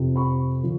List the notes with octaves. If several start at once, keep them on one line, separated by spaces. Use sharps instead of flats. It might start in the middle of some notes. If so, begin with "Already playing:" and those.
Already playing: F2 C3 F3
B5 C#6
D3 F3